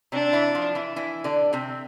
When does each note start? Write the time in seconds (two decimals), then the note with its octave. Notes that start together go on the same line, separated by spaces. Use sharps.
0.12 C3 C4 D4
0.33 E3 E4
0.55 F3 F4
0.75 E3 E4
0.96 E3 E4
1.24 D3 D4
1.53 C3 C4